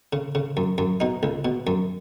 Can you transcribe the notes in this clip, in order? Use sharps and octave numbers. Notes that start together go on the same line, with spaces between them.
C#3
C#3
F#2
F#2
B2 D#4
C#2
B2
F#2